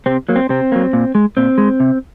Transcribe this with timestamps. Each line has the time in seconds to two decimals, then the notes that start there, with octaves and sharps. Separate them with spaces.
0.06 C3 C4
0.29 F#3 A#3
0.36 C4
0.49 C3 C4
0.72 F#3 A#3
0.93 A#2
1.15 G#3
1.37 A#2 C4
1.58 G#3
1.80 C3